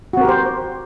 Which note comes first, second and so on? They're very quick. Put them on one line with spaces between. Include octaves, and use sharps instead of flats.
F#4 C4 A#4 G4 C5